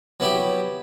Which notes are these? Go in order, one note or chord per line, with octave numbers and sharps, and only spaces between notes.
F#3 B3 E4 G4